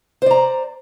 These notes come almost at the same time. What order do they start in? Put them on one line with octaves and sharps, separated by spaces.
C5 D5 A#5